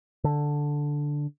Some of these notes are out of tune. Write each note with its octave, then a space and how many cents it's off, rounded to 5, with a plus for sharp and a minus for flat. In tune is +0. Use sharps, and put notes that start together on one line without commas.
D3 +0